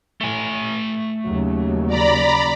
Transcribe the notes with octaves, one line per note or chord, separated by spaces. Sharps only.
A2 A3 G#5
D#2 C#3 F#3
D5 A#5 B5